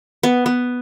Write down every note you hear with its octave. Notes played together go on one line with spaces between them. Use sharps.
B3
B3